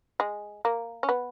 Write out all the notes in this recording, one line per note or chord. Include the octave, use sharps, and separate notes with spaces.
G#3
A#3
C#4
B3